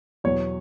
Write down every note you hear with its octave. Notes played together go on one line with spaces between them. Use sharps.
E2 B2 F#3 C#5